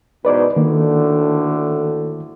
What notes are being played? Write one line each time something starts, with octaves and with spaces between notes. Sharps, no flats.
E2 G#2 B2 B4 D5 D6
D2 A2 D3 D#3 A#3